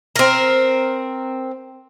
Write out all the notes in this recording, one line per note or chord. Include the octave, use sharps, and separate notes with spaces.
C4 A#4